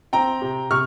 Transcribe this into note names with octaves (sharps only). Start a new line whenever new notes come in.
C4 G5 A#5
C3
C3 C#6 F6